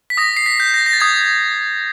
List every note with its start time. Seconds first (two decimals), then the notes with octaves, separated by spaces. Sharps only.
0.10 B6
0.17 D#6 A#6
0.37 C7
0.46 B6
0.60 G6
0.74 A#6
0.86 A#6
0.93 A6
1.00 D#6 G#6